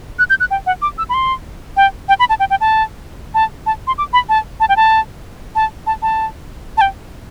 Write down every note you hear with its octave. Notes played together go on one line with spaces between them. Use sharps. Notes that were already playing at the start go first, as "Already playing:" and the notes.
F#6
G6
F#6
G5
F#5
D6
E6
B5
C6
G5
G5
B5
A5
G5
G5
A5
A5
A5
C6
D6
B5
A5
A5
G5
A5
A5
A5
A5
A5
G5